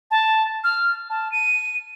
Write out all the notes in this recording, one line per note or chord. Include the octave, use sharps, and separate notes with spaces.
A5
F6
A5
D#7